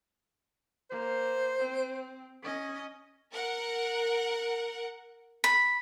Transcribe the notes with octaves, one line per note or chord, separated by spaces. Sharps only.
A#3 C5
C4
C#4 D#5
A#4 F#5
B5